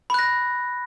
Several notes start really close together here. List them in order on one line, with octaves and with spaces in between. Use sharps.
B5 F#6 A#6